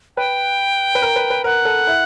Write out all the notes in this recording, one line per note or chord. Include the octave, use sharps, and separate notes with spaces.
B4 G5
B4
A#4
B4
B4
A#4 F#5
A4
E4